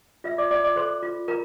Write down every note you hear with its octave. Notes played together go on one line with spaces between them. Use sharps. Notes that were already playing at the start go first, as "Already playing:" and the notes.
F4 E5 E6
D5 D6
F4 D5 D6
D5 D6
A4 C5 C6
F4
F4 A#4 A#5